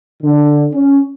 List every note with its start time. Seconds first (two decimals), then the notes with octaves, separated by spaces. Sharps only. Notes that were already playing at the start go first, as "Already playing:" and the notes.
0.22 D3
0.74 C#4